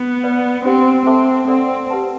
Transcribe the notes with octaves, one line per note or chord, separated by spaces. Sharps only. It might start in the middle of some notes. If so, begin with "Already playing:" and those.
Already playing: B3
B4 D5 F#5
C4 D4 G4 C5 F#5
C4 A4 C5 E5 A5 D6
C4 A4 D5 F#5
G4 B4 F#5 A5